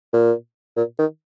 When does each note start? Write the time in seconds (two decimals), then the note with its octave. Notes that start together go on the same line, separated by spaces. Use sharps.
0.13 A#2
0.77 A#2
0.99 D#3